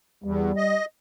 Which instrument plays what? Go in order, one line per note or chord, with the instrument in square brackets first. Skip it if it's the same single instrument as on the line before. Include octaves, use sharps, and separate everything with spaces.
[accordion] E2 [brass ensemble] G3
[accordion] D#5